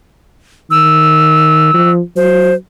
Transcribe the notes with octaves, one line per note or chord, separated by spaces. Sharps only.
D#3 E6
F3
F#3 C5